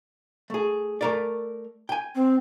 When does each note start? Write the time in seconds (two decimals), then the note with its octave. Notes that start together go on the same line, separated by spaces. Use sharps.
0.50 A3 G#4
1.01 A3 A#4 D5
1.89 G5 G#5
2.15 C4